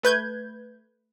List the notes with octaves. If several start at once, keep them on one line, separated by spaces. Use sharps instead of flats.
A3 B4 G6 G#6